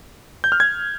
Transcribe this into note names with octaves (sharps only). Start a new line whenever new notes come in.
G6
F6
G#6